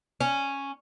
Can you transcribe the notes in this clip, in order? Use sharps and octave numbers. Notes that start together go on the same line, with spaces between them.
C#4